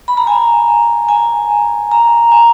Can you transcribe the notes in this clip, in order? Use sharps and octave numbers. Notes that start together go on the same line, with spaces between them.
B5
A#5
G#5
G#5
A#5
G#5